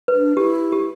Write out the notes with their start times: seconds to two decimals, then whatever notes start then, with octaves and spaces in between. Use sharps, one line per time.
0.08 B4
0.14 D4
0.37 E4 G4
0.72 G4